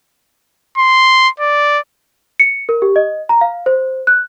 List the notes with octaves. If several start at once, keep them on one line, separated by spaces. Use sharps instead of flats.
C6
D5
C#7
A#4
G4
D#5
A#5
F5
C5
F#6